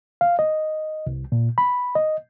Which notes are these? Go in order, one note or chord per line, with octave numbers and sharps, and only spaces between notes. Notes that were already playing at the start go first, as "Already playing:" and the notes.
F5
D#5
C2
A#2
B5
D#5